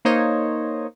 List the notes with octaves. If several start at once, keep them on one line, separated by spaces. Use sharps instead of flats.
A#3 D#4 C5 C#5 D#5